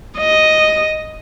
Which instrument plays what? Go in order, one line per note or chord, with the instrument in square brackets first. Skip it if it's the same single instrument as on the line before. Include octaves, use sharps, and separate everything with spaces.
[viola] D#5